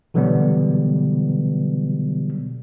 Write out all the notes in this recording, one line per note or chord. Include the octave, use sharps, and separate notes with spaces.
B2 D3 E3 F#3 G3 B3